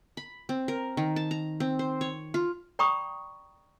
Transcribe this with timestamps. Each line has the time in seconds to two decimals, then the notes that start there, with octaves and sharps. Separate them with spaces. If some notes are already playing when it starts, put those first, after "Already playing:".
0.17 B5
0.49 C4
0.68 A#4
0.97 D#3
1.16 A5
1.31 A#5
1.60 C4
1.79 C5
2.01 C#5
2.34 F4
2.79 D5 G5 A#5 B5 C#6 D#6